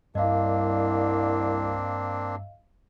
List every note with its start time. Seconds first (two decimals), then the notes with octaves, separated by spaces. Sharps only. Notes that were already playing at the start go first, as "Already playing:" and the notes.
0.15 C2 G2 A#3 C4 D4 D#5 F5